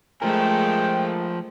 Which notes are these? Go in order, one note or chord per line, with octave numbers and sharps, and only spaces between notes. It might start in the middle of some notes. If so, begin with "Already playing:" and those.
F3 G#3 A3 A#4 G5